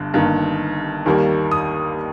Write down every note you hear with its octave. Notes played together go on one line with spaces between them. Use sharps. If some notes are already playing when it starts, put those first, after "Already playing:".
Already playing: G1 G2
G1 G2 D#3 A#3
D#2 D#3 G3 A#3
D#6